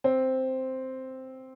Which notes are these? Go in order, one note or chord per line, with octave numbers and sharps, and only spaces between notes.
C4